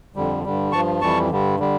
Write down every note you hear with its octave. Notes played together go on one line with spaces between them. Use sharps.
F2 D3 G3
G2 D3 G3
G2 F3 A5 C#6
F2 E3 G3 A5 C#6
G2 D3 G3
D3 G3